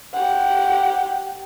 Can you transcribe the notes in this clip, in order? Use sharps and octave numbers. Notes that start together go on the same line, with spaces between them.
G4 F#5